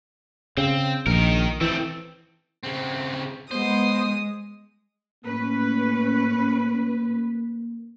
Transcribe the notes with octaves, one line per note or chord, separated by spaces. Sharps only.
C#3 C4
A#1 D#3 A#4
E3 A3 C4
C#3 C4
G#3 B3 C5 D#6
A2 A#3 C#4 B4